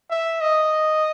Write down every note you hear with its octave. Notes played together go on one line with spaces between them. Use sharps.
E5
D#5